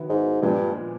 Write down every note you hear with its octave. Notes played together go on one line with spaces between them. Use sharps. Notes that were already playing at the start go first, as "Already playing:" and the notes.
Already playing: D#3 F#3 B3 E4
G#2
G2 A#2 F3 G#3 B3 D4